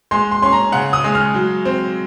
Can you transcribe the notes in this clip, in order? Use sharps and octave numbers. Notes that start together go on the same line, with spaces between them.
G#3 C6
C6
C#4 C6
A#5
C#3 F#5
D#6
G#3
F6
F#3
C4